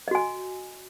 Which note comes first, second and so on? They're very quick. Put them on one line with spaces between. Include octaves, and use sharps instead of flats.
D#5 F#4 G#5